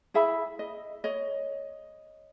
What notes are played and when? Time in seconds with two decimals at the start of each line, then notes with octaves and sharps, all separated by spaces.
0.14 E4 G#4 E5 B5
0.59 D#5
1.04 C#5 D#5